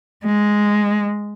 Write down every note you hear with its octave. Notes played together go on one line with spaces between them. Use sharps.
G#3